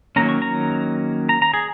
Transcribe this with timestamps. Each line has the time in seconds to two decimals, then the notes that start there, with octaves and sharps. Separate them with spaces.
0.16 D#3 F#3 A#3 C#4 A#5
0.29 C#6
0.42 A#5
1.29 A#5
1.42 A#5
1.54 G#4